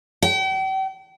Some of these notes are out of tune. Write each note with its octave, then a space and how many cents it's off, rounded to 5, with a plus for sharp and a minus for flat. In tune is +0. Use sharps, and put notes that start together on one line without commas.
G5 -40